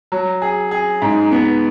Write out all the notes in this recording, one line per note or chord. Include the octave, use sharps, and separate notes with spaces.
F#3
G#4
G#4
G#2
B3